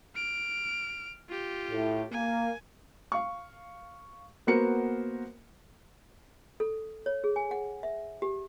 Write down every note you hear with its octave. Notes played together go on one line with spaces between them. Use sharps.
F6 D7
F4 G4
A2
A#3 G#5
F5 C#6
A#3 B3 F#4 A#4 C5 C#7
A4
C#5
G#4
G#5
F#5
E5
G4